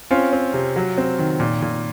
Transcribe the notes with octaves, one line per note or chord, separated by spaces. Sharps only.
C4 C#4 F4
C4
C3
F#3
C4
D#3
A#2
A#2